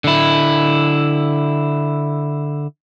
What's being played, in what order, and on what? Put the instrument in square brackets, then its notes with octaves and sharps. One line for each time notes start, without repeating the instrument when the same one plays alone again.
[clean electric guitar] D3 E4